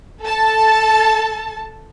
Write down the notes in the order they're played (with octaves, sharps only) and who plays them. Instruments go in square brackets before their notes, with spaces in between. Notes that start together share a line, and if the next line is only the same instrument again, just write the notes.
[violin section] A4 A5